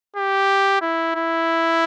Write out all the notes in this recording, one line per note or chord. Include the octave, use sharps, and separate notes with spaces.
G4
E4
E4